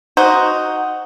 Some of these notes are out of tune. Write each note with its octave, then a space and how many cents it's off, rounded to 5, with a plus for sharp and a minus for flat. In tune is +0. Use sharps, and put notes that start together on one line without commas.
D#4 +0 F#4 +0 C5 +0